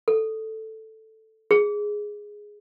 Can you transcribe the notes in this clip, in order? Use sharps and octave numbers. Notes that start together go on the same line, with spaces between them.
A4
G#4